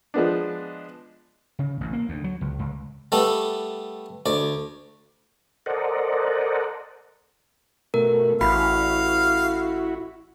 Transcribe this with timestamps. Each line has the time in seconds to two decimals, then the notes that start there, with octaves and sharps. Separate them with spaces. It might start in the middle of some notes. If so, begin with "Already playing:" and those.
0.14 F3 G#3 B3 D4
1.59 C#3
1.81 A1
1.93 A#3
2.09 D2
2.24 F#3
2.41 C#2
2.59 C#2
3.12 G3 A3 B3 A4
4.26 D2 D5
5.66 A4 A#4 C5 D5 D#5 F#5
7.94 B2 A3 A#4
8.41 A1 E4 F#4 F5 B5